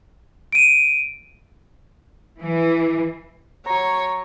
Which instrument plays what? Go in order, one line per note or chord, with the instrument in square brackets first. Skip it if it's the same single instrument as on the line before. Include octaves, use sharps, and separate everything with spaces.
[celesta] D7 D#7
[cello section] E3
[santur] F#3 A#5 [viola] C#5